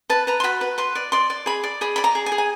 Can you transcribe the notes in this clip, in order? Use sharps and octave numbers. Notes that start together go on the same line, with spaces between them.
B4 A5
B4 A#5
C6
F#4 B5
B4
B4 C6
D5
D5 C6
D5
G#4 B5
D5
G#4 B5
D5 B5
A#5
G#4
G#5
G#4
G#5